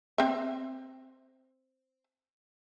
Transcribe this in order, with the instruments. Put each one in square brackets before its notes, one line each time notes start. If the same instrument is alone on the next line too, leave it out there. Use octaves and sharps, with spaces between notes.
[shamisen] C4 E5